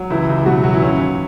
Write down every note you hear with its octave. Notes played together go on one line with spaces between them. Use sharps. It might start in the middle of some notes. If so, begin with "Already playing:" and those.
Already playing: F#3
C#2 E3 E4
C#2
E4
B2 F#3 F#4
F#3 F#4
E3 E4
D#2 C#4
D#2